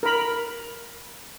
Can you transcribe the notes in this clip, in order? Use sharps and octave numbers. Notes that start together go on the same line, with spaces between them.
A#4 B5